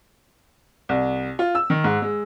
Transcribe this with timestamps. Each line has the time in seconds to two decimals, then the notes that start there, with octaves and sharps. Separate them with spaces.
0.89 C2
1.39 F4
1.55 E6
1.70 D#3
1.84 G#2
2.02 G#3